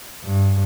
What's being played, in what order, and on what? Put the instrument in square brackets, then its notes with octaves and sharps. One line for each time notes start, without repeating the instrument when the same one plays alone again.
[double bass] G2